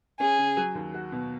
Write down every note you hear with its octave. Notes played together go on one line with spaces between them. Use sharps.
C#4 G#4
C#3
F#3
D#2
F#4
B2